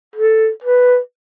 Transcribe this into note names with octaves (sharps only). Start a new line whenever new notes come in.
A4
B4